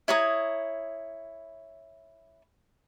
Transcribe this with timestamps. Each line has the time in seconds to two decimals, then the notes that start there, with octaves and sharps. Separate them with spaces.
0.08 E4 C#5 A#5 D#6